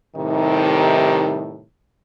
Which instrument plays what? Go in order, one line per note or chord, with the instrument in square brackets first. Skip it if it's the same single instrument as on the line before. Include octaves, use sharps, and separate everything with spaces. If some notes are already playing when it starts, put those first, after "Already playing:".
[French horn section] A2 C3 D#3 G3 D#4